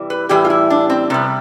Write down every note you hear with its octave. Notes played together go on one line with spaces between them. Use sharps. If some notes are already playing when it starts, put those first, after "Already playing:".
Already playing: C3 E3 G3
B4
A2 E3 G3 G4
F4
E4
D4
C4
C3 G3 B3